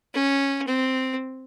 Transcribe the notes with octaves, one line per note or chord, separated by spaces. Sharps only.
C#4
C4